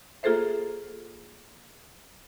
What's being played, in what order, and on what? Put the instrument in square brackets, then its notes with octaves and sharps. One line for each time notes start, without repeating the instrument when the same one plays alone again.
[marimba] A#3 F4 G#4 A4 C5 E5